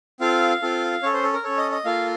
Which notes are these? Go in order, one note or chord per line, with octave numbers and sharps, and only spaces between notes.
C4 F4 A4 F5
C4 F4 A4
C#4 A4 C#5
C5
A4
A#4
C#4 A4 C#5
D#5
D#5
A#3 F4 A4 F5